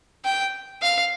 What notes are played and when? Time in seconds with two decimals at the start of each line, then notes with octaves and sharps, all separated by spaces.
0.25 G5
0.82 F5